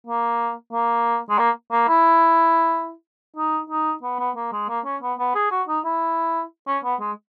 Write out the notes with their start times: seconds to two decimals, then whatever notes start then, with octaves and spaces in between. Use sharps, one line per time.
0.07 A#3
0.72 A#3
1.29 G#3
1.39 A#3
1.72 A#3
1.88 E4
3.36 D#4
3.70 D#4
4.03 B3
4.19 B3
4.36 A#3
4.52 G#3
4.69 A#3
4.85 C#4
5.02 B3
5.19 B3
5.35 G#4
5.51 F#4
5.68 D#4
5.85 E4
6.67 C#4
6.84 B3
7.00 G#3